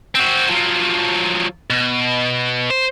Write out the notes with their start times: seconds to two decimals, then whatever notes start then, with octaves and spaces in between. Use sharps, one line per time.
0.15 C4 F#4
0.49 F3 F#3
1.70 B2
2.70 C5